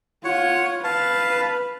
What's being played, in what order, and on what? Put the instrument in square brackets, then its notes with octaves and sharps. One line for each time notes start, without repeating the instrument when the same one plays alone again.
[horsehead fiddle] F4 [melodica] C#5 F#5
[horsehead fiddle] B4 [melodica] F5 A5